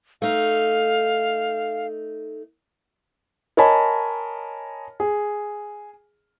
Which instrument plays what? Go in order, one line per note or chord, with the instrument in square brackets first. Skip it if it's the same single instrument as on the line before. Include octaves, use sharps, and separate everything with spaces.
[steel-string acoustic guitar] A3 D#4 [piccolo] F5
[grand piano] A#4 C#5 D#5 G#5 A5 B5
G#4